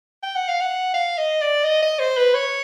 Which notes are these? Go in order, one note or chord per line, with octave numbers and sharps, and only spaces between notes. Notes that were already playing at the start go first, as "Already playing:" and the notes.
G5
F#5
F5
F#5
F5
D#5
D5
D#5
D#5
C5
B4
C#5